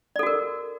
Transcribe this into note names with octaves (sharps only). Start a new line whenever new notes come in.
F#4 A4 A#4 D5